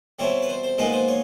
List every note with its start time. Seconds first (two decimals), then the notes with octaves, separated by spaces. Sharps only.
0.19 B2 G3 C4 E4 C#5
0.42 B4
0.49 C5
0.63 C5
0.78 A#2 F3 G#3 B3 D#4 B4
0.93 C5
1.08 C#5